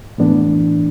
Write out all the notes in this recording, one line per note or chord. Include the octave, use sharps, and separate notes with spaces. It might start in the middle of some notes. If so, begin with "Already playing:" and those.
A2 E3 B3 D4